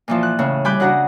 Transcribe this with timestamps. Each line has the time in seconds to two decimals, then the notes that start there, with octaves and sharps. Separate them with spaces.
0.08 A#2 E3 F3
0.23 F#6
0.39 A2 C#3
0.65 G3 G#5 B5 D6 F#6 G6
0.80 C#3 D4 F#4 F#5 A#5